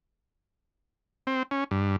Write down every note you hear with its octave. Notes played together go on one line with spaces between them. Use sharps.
C4
C#4
G2